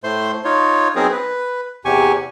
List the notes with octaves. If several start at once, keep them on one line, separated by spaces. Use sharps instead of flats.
A2 A3 C5 C6
D#4 F4 C#5
F#3 B3 C4 D#4 G#4 A#4
B4
E2 C3 G4 G#5 C#6